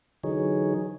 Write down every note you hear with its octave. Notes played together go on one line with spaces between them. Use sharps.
D3 E3 F#3 D#4 G#4 C#5